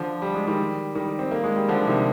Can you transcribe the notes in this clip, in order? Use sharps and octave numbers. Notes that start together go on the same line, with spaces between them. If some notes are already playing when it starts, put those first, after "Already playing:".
Already playing: D3 F3
G3
G#3
D#3 G3
D#3 G3
C4
A#3
G#3
G3
D3 F3
C3 D#3